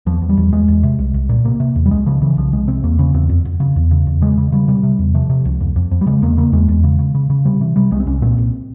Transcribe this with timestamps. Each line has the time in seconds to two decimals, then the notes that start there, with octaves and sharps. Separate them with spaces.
0.06 E2 F3
0.22 E2
0.29 G3
0.37 E2
0.52 E2 G#3
0.68 E2
0.83 C3
0.99 C2
1.14 C2
1.29 A#2
1.45 C3 A#3
1.60 C3
1.76 E2
1.86 G3
1.91 C#2 G#3
2.06 C#3 F3
2.22 C#3 E3
2.37 C2 F3
2.53 C2 G#3
2.68 C3 C4
2.84 E2 A#3
2.99 C#3 C#4
3.14 E2 C4
3.29 F2
3.45 F2
3.60 C#3
3.76 E2
3.91 C#3
4.07 E2
4.22 C#3 G#3
4.38 C#3
4.52 C#3 G3
4.68 C3 G3
4.83 C3
4.99 E2
5.15 C3 F3
5.30 C3
5.45 C#2
5.60 F2
5.76 F2
5.91 F2
6.01 G3
6.06 C#3 G#3
6.22 E2 A#3
6.37 C#3 A#3
6.52 E2 G#3
6.69 E2
6.83 C#3
6.99 C#3
7.15 C#3
7.30 C#3
7.45 C3 G3
7.61 C3 E3
7.76 C3 G3
7.91 C2 G#3
8.00 C4
8.07 C2 C#4
8.22 A#2 C4
8.38 C2